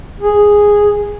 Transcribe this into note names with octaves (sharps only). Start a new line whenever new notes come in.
G#4